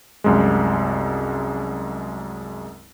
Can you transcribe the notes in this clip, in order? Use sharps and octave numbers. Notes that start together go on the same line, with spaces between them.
C2 F#2 G#3